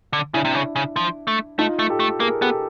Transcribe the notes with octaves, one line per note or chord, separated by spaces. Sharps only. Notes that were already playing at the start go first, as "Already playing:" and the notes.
D3
C#3 D4 E4
C3
C#3
C#3
F3
A3
A3 D#4 F4
A3
G4 A4
A3
A#3 G#4 A#4
B3 G4 A4